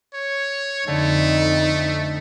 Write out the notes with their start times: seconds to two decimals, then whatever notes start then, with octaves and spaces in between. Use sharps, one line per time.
0.14 C#5
0.88 F2 D3 A3 D#4